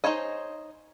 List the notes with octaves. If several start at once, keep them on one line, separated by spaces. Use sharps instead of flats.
D#4 G#4 C5 C#5 D#5